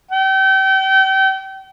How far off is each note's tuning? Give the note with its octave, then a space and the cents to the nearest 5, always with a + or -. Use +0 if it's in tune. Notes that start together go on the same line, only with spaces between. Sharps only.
G5 -35